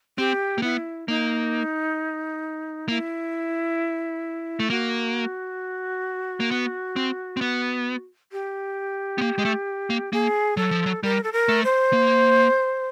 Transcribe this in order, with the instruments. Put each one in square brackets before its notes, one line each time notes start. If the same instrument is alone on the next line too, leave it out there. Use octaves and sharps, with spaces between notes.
[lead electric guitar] C4 [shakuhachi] G4
[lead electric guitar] A#3
[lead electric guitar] B3 [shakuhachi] E4
[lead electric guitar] A#3 [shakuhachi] D#4
[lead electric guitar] A#3 [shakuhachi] E4
[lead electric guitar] A3
[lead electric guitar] A#3 [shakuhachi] F#4
[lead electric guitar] A#3
B3
C4
C4
B3
[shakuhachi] G4
[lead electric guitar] B3
A#3
G#3
A3
A#3
[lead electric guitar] A#3 [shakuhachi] G#4
[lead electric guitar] F#3 [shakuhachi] A4
[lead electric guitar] F3
F#3
[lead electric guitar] G3 [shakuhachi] A#4
[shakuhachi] A4
A#4
[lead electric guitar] A3
[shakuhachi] C5
[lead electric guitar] A#3